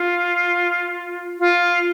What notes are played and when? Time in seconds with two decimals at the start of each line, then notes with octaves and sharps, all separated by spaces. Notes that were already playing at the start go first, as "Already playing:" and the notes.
Already playing: F4
1.39 F4